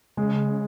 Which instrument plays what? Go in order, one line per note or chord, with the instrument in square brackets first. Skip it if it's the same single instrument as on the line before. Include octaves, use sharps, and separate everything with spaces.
[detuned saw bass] C#3 [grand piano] G#3